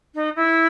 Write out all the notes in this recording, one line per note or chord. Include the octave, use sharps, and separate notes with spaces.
D#4
E4